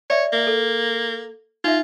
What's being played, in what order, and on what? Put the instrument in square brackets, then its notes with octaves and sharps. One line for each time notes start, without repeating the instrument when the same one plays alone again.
[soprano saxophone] C#5 [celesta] D5 E5
[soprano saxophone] A#3
[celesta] A4
[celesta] D#4 E5 [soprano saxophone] F4